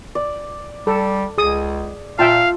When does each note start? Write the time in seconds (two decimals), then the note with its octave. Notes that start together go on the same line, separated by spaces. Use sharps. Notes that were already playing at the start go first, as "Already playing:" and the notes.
0.15 D5
0.87 G3 A4
1.38 C#2 G#4 D#6
2.19 A#2 F4 E5 F5 G5 A5